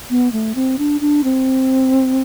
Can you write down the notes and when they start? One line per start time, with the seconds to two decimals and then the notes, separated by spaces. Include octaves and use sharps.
0.10 B3
0.32 A3
0.55 C4
0.78 D4
1.01 D4
1.24 C4